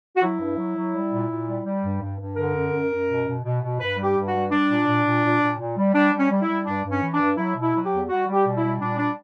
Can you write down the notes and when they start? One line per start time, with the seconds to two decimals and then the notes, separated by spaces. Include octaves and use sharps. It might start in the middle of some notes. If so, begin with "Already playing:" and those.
0.17 F#4
0.22 F#3 E4
0.40 G2
0.58 F#3
0.76 F#3
0.94 G3
1.12 A#2
1.30 A#2
1.47 G3
1.65 G3
1.84 G2
2.01 G2
2.19 G2
2.37 D3 A#4
2.54 F#2
2.72 F#2
2.91 F#2
3.09 B2
3.27 B2
3.45 B2
3.62 B2
3.80 G2 B4
3.98 G3
4.03 G4
4.15 G2
4.28 F#4
4.34 G3
4.51 G3 D4
4.69 A#2
4.87 A#2
5.05 A#2
5.23 A#2
5.41 A#2
5.58 A#2
5.77 G3
5.94 G3 D4
6.12 G3
6.18 C#4
6.30 G3
6.42 E4
6.48 G3
6.66 G2 D4
6.85 G2
6.90 C#4
7.02 E3
7.14 D4
7.20 G2
7.37 F#3 E4
7.56 B2
7.62 E4
7.74 F#3
7.86 G4
7.91 E2
8.09 G3 F#4
8.27 G3
8.33 G4
8.46 B2
8.57 E4
8.63 G3
8.80 A#2 D4
8.98 G3 D4